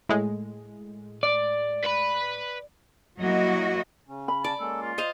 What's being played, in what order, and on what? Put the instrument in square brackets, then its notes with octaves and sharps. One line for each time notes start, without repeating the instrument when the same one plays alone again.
[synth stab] A2 G#3
[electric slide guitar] D5
[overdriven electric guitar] B4 B5
[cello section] F#3 G3 A#3 E4 F#4 D#5
[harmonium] C#3 C#4
[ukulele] B5
[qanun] D5 [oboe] A5
[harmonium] G#3 A#3 C#4 [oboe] A4
[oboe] F4
[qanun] C5 D#5 F5